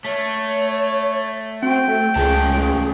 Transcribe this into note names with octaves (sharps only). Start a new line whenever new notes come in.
A3 C#5
C4 F#4 G5
A3
C#2 C#3 A3 G#4 A5